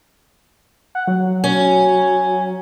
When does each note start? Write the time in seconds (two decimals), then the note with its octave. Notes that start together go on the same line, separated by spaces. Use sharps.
0.95 F#5
1.07 F#3
1.44 C#4